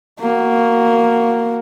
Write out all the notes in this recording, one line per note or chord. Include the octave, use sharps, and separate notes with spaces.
A#3 F#4